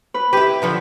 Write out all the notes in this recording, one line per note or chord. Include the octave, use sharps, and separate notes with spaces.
B4
E4 G4 B4
D3 F3 F#3